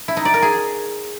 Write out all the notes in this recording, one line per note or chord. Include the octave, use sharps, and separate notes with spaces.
E4
D#4
D5
A#4
G#4